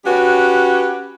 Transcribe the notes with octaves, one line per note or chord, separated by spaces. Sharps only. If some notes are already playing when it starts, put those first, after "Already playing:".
C#4 F#4 G4 B4